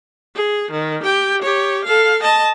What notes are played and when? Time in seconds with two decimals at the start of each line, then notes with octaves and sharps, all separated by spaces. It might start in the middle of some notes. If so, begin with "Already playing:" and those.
0.36 G#4
0.71 D#3
1.03 G4 G5
1.42 G4 C#5
1.85 A4 F5
2.23 D#5 A5